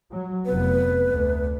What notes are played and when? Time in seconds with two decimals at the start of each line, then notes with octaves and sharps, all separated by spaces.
0.11 F#3
0.46 F1 B3 B4
1.09 D2